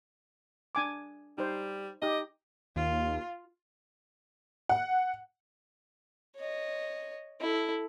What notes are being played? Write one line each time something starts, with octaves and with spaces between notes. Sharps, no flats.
D4 G#5 D6
G3 D#4 C5
D#4 G4 D#5
D#2 F4
F#5
C#5 D#5
E4 A4